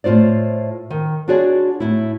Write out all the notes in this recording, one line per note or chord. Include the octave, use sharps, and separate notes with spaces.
A2 F4 C5 D5
D#3
D4 F4 F#4 G#4 C#5 D5
A2 E4